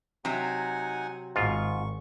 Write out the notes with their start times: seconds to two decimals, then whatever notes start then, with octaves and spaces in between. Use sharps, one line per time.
0.25 C3 F#3 D#4 F#5 G#5
1.36 G#1 G#2 F4 C#6